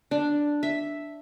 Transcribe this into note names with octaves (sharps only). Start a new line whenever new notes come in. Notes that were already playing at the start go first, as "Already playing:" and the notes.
D4
E5